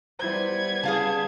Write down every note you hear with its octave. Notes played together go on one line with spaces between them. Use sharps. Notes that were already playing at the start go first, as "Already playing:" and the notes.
G3 B3 E4 C5 G#6
C#3 G#4 F5 A5